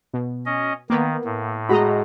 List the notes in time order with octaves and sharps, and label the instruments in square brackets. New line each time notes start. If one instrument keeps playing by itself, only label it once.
[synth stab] B2
[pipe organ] C#4 D#5
[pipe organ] D#3 [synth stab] A#3 B3
[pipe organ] A2
[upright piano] G#3 F#4 [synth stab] D#5 A#5 B5